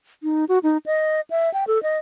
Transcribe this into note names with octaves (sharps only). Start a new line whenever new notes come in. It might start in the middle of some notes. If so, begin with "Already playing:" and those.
D#4
F#4
D#4
D#5
E5
G5
A4
D#5